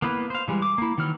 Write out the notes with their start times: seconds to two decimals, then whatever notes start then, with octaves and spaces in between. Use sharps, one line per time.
0.02 A#3 B3 E4 B4
0.30 C5 F5
0.48 E3 G3 G#3
0.62 D6
0.78 A#3 E4
0.98 D#3 E3 F#3 F6